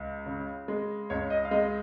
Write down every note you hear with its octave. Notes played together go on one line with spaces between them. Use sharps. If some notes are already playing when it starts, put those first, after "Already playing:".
Already playing: C#2
C#3
G#3
C#2 C#5
D#5
F5
G#3 D#5